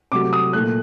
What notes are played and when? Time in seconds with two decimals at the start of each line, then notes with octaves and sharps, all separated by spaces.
0.12 C3 F#3 A3 D6
0.33 D#6
0.53 A#2 A3 F#6